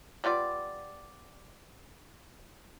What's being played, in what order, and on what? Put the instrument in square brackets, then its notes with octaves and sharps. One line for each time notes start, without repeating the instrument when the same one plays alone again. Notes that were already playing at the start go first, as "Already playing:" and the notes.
[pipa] G3 B3 F4 D5